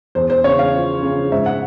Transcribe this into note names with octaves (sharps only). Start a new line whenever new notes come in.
E2 C5
C5
C#3 C#5
F5
F3
C#3
G#2 E5
F#5